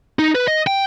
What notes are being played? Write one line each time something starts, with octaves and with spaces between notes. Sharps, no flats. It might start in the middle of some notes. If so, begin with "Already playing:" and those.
D#4
B4
D#5
G5